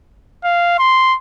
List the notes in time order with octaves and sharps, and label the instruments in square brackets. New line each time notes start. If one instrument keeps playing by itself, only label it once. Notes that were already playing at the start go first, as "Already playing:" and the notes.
[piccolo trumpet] F5
C6